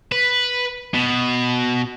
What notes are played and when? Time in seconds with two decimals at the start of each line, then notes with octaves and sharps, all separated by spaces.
0.12 B4
0.94 B2